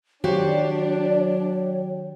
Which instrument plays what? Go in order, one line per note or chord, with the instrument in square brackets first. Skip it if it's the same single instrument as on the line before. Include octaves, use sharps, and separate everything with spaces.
[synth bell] D#3 F#3 [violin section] D4 [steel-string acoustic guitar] F#4 G4 C5 [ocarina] C#5